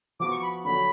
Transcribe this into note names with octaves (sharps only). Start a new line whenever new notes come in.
F3 B3 F#4 D6
C#6
B5
D3 F#3 C#4 F#4 B5